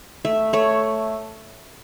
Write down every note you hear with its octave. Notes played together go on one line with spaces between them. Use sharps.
A3 E5
A3 C#5